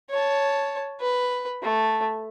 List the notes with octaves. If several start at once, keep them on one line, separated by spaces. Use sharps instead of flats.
C#5 A5
B4
A3